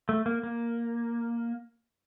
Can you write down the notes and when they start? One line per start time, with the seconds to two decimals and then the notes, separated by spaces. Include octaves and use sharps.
0.09 A3
0.26 A#3
0.43 A#3